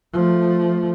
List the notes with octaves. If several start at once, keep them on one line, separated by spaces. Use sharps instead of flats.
F3 A3